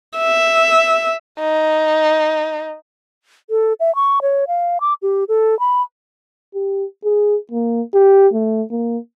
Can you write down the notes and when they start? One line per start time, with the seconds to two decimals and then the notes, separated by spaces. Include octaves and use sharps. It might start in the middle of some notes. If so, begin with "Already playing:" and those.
0.18 E5
1.39 D#4
3.50 A4
3.80 E5
3.95 C#6
4.22 C#5
4.48 F5
4.81 D6
5.02 G4
5.29 A4
5.59 B5
6.55 G4
7.04 G#4
7.52 A#3
7.94 G4
8.33 A3
8.71 A#3